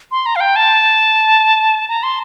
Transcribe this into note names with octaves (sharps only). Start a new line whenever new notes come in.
C6
A#5
F5
G5
A5
A#5
C6